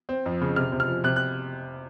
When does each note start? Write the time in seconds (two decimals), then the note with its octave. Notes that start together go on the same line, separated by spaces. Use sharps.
0.09 C4
0.26 F2
0.42 C#3
0.56 C3 F6
0.72 C3
0.80 F6
0.88 F3
1.04 C3 F#6
1.16 F#6